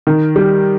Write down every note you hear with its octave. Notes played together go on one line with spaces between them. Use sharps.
D#3
G3